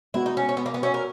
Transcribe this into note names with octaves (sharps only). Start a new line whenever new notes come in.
G#3 B3 E4 F#4
D#4
C#4
C#4
B3
A#3
B3
C#4 F#4 C#5 E5
A#4